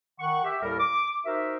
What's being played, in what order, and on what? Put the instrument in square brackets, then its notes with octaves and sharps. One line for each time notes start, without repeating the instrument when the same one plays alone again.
[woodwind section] D#3 F#5 C#6
G4 E5
D#2 A2 G3 A4 A#4
D6
D#4 F#4 A#4 C5 E5